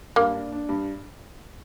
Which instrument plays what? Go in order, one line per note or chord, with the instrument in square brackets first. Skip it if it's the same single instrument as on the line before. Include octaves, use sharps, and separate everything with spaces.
[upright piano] G2 [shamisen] A#3
[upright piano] D4
D4
G2